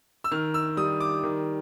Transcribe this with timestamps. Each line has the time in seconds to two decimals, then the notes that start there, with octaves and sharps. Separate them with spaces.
0.24 E6
0.31 D#3 F6
0.54 E6
0.77 G3 D#6
1.00 D6
1.23 D#3